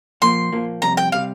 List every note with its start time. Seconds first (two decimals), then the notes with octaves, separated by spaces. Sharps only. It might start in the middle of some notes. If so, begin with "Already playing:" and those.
0.22 A#2 F3 A#3 C6
0.52 A#2 F3 A#3
0.82 F2 C3 G3 A#5
0.97 G5
1.12 C3 G3 F5